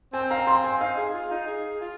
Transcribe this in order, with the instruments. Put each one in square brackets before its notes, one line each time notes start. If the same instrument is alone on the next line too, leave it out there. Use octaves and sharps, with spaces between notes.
[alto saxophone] C4 [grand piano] G#5
[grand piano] F5 A#5
G#5 C6
G#5
[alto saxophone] D#4 [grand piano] F5
[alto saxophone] G#4
F4
D#4
G#4
F4